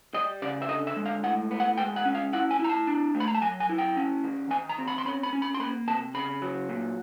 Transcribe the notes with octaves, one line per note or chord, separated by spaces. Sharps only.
G3 D#5
C#3 D5
E5
D3 D#5
E5
G#3
F5
A2 F#5
B3
F#5
G#3 G5
F#5
C#4
F5
E4 F#5
G#5
E4 A#5
A5
D4
A3
B5
A#5
A5
F#3 G#5
G#5
E4
G5
C#4
D#3
D#3 G#5
A#5
C4
B5
C6
C#4 B5
B5
C#4
B5
C6
A#3 B5
C3 A5
C#3 B5
F#3
A#2